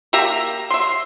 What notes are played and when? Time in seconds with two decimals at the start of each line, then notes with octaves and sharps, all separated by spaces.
0.13 A#3 G4 E5 A#5
0.71 E5 C6